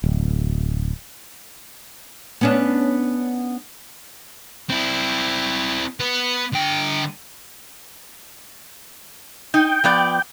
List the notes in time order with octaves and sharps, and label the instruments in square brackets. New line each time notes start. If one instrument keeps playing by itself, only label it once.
[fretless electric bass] D1
[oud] B3 C#4 D4
[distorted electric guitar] C4 E4
B3
D3 G5
[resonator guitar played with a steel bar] D#4 [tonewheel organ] G5
[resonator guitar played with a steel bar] F3 B3 D5